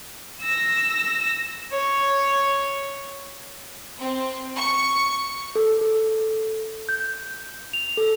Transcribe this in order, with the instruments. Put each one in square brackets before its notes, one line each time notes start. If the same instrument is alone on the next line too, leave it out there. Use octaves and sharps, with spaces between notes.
[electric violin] E6 A#6
[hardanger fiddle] C#5
[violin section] C4
C#6
[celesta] A4
A4
G6
F7
A4